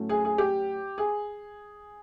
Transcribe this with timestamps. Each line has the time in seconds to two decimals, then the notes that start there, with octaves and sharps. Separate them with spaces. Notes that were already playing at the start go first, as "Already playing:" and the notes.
Already playing: A2 F#3 A3 C#4
0.09 G#4
0.25 G#4
0.38 G4
0.98 G#4